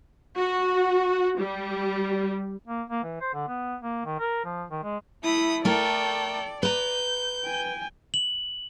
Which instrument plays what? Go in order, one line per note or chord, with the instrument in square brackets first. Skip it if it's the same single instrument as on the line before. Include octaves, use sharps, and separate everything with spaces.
[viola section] F#4
G3
[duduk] A#3
A#3
E3
C5
D3
B3
A#3
D#3
A#4
F3
D#3
G#3
[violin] A3 D#6 [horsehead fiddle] E4 B5
[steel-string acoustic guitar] A3 A#4 [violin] A4 G5 [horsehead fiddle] D5
[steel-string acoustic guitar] B4 A#5 [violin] G6
[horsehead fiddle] G5 G#5
[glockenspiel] F#7